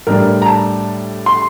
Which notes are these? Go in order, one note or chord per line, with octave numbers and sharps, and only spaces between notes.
A2 G3 D4 A#4
A#5
A5
C6